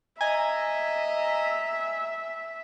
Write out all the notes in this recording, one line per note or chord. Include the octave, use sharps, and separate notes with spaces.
D#5 E5 G#5 A#5